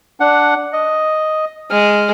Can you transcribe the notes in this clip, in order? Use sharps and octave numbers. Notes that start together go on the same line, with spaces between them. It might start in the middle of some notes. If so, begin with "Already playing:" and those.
D4 F#5
D#5
G#3 F6